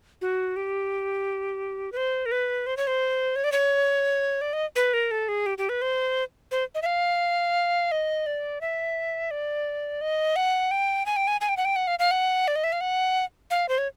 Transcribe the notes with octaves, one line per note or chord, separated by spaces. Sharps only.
F#4
G4
B4
C5
A#4
B4
C5
C#5
C5
C#5
D5
C#5
D5
D#5
B4
A#4
A4
G#4
G4
G4
B4
C5
C5
D#5
E5
F5
D#5
D5
E5
D5
D#5
F#5
G5
G#5
G5
G#5
G#5
G5
F#5
G5
F#5
F5
F5
F#5
D5
D#5
E5
F5
F#5
F5
C5
C#5